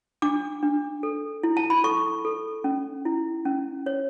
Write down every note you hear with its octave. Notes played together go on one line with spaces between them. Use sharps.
D4 D6
D4
A4
E4
A5
B5
A4 C#6
A4
C#4
E4
C#4
C#5